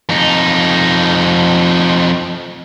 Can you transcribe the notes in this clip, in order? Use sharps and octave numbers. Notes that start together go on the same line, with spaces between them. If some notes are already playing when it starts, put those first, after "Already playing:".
F2 D#4